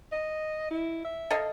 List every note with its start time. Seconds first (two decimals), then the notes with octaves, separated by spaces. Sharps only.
0.12 D#5
0.70 E4
1.04 E5
1.31 A4 D#5 F5